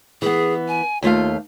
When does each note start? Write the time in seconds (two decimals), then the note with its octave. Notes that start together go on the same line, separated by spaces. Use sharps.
0.22 E3 B3 G#4
0.68 G#5
1.03 D#2 A3 F4 F5